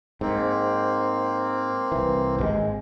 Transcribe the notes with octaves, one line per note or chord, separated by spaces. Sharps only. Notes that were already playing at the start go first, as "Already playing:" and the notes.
G#2 A#3 C4
C2 E3
G#1 C3 G#3